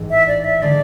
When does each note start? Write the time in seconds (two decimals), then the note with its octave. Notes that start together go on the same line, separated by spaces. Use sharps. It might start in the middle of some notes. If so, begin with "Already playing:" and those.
Already playing: A1 G#2 E3 G#3
0.10 E5
0.27 D5
0.44 E5
0.62 D3 G#3 D5